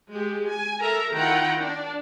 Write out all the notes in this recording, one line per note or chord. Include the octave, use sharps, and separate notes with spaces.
G#3 G4
G#5
A4 A#4 E5 A#5
D#3 E4 F4 F#5 G5 A#5
D4